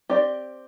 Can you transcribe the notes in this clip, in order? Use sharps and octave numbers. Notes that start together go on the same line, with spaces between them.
C4 G4 D5